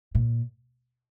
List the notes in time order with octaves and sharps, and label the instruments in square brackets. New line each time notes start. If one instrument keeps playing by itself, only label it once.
[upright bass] A#2